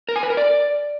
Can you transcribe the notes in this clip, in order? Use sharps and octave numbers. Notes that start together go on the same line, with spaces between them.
A#4
G#5
B4
A#4
D5